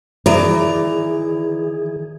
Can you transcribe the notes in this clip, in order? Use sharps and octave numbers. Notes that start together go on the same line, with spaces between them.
D#3 E3 G#4 D5 A#5